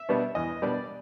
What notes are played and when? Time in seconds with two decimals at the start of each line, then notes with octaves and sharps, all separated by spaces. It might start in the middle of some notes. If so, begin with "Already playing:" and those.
Already playing: E5
0.09 B2 G3 B3 D4
0.35 E2 D#5
0.62 B2 G3 B3 D4 D5